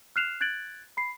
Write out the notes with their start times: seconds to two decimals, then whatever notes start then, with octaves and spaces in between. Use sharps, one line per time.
0.16 F6 F#6 C7 E7 F7
0.41 F#6 G#6 A6 D7 F#7
0.97 B5 C7